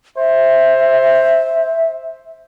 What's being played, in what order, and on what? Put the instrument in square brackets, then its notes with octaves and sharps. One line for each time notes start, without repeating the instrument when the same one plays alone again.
[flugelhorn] C5 [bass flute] E5